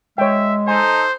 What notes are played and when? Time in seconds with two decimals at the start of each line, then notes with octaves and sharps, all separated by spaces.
0.18 G#3 C#5 E5 G5
0.68 D#4 A4 C5 G#5